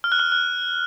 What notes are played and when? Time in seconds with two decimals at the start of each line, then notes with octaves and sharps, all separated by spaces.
0.04 F6
0.12 F#6
0.19 F6
0.32 F#6